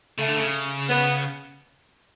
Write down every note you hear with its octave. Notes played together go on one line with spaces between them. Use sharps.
C#3 A3
D3
C#3
B3